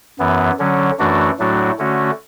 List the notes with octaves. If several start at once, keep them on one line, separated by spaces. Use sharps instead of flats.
F#2 E3 B3
D3 F#3 C#4
F#2 E3 A3 D4 F#4
A2 F#3 A3 D4 F#4
D3 A3 C#4 F#4